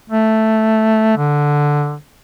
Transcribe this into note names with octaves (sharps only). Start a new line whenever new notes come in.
A3
D3